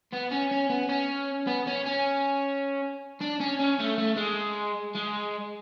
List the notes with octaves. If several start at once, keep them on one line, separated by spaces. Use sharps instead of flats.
B3
C#4
C#4
B3
C#4
B3
C#4
C#4
D4
C#4
C#4
A3
A3
G#3
G#3